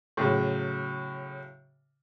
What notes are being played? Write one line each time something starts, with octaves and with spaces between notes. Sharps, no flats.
A2 C#3 F#3